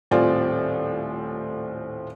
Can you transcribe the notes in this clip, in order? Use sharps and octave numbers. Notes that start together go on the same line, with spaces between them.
D#1 A2 C4 F4 D5 G#5